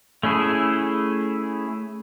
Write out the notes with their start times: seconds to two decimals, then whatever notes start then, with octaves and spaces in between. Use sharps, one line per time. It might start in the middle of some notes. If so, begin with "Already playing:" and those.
0.23 A3 C#4 E4 G#4 A4